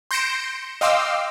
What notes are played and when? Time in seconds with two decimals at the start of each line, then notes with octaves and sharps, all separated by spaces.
0.11 C6 G6 A#6 C#7 D7 E7
0.81 D#5 F5 G5 C6 D6 E6